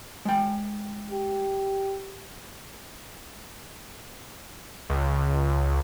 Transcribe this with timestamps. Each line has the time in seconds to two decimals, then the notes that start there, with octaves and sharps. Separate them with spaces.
0.25 G#3 G5
1.11 G4
4.90 C#2